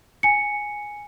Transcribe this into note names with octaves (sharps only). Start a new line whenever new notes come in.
G#5 C#7